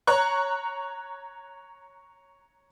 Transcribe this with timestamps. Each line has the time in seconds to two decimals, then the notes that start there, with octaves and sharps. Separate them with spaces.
0.07 C#5 A#5 C#6 F#6